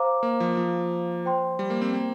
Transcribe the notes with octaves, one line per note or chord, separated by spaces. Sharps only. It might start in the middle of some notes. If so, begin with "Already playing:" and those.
Already playing: C5 F5 A#5 D6
A#3
F3
F3
C5 G5 C6
G3
A#3
C4
A#3